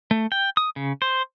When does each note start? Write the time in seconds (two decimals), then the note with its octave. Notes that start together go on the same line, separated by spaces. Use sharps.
0.11 A3
0.32 G5
0.57 D#6
0.76 C#3
1.02 C5